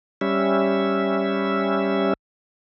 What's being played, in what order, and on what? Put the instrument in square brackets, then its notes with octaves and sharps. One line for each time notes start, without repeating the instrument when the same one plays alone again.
[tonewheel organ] G3 C#4 E5